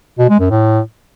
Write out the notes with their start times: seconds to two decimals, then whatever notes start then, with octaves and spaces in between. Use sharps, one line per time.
0.19 B2
0.30 G#3
0.40 F#2
0.51 A2